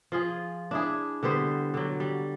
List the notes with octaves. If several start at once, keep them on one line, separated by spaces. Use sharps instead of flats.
F3 F4 G#4
D4 E4 G#4
D3 G3 B3 C5
D3 F#3
G3